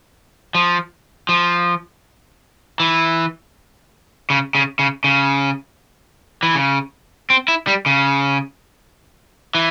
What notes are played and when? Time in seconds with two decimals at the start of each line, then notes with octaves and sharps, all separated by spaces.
0.55 F3
1.29 F3
2.80 E3
4.30 C#3
4.55 C#3
4.79 C#3
5.04 C#3
6.43 E3
6.55 C#3
7.30 C4
7.48 E4
7.67 G3
7.86 C#3
9.55 E3